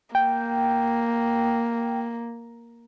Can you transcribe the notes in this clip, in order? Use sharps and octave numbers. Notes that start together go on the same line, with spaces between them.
A#3 G5